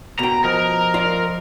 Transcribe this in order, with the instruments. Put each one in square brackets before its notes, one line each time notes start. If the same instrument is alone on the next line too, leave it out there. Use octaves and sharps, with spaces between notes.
[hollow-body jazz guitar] B2 G5 [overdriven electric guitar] A#5
[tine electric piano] F3 D#5 [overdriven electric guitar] A#4
[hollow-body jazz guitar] F4 D5